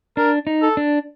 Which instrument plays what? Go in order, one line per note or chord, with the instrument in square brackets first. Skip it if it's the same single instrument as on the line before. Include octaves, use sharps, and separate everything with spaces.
[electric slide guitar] D4 [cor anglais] A#4
[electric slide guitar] D#4
[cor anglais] A4
[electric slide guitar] D4